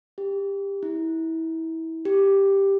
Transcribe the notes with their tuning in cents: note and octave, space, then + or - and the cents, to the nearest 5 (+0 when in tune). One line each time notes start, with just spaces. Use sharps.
G4 +20
E4 -25
G4 +5